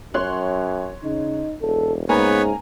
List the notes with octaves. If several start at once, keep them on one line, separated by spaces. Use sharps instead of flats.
F#2 C#5 C6 F#6
C#3 D#4
E1 A4
G#2 C#3 A#3 B3 B4 C#5 G#5 A#5